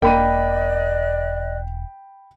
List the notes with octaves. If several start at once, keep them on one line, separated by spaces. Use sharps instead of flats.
E1 A#3 D5 D#5 G5 B5 F#6 D#7